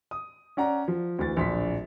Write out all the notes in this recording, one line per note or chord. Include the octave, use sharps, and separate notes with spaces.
D#6
C#4 D5 F#5 A#5
F3
D2 E3 A6
D1 A#1 D4 C6 B6